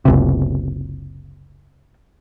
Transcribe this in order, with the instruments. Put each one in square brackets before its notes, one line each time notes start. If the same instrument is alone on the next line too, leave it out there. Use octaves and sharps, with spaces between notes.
[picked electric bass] F#1 C#2 C3